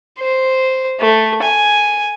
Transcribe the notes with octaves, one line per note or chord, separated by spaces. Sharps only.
C5
A3
G#5